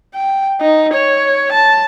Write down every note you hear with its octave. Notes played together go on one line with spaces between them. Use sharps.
G5
D#4
C#5
A5